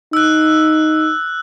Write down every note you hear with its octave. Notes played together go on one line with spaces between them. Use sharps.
D#4 E6 F#6